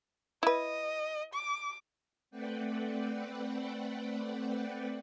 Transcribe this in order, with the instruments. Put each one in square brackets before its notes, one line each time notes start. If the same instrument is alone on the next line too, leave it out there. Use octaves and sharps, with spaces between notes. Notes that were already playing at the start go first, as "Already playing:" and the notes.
[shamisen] E4 B4 [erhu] D#5
[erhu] D6
[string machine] A3 C4 B4 D5 F#5 G5